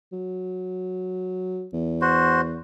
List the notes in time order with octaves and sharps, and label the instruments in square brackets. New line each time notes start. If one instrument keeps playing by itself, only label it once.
[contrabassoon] F#3
E2
[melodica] F#4 C5